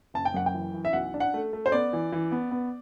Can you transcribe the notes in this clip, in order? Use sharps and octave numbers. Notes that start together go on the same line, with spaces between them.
F#1 A5
G5
F#2 F#5
G5
E3
E3
E5
B1 F#5
D4
F#5
A3
A3
C5
B3 D5
E3
E3
B3
B3